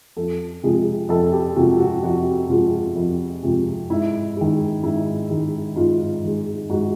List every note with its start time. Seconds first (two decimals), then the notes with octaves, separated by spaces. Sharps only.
0.17 F2 A4
0.63 C3 F3 G#3
1.09 F2 A4
1.33 G4
1.56 C3 F3 G#3 F#4
1.80 F#4
2.03 F2 F#4
2.49 C3 F3 G#3 F4
2.96 F2
3.43 C3 F3 G#3
3.90 G#2 E4
4.37 D#3 G#3
4.83 G#2 E4
5.30 D#3 G#3
5.76 G#2 F4
6.23 D#3 G#3
6.70 G#2 F#4